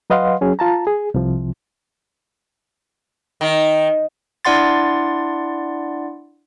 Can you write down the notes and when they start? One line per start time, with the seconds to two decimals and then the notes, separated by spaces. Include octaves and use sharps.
0.10 F#3 B4 D#5 F5 F#5 C6
0.41 F#3 C#4 G#4
0.59 F4 A5 A#5
0.87 G#4
1.14 C2 C3 F3
3.41 D#3
4.45 D4 E4 D5 F#5 C6 A6